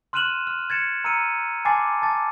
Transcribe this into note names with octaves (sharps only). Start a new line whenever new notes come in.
C6 F6 F#6 D#7 E7 F#7
F6
G#6 A6 C#7 E7
A#5 E6 F6 C#7 D#7
G#5 A5 C6 D6 A6 C7
A5 D6 A6